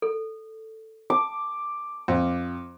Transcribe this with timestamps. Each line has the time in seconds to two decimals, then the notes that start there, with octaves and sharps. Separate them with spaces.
0.02 A4
1.10 D6 D#6
2.08 F2